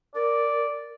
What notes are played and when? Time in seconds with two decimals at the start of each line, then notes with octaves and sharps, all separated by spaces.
0.15 A#4 D5